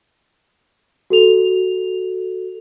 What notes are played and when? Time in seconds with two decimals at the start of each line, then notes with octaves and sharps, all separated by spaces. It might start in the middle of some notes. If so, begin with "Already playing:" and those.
1.10 F#4 A4 F7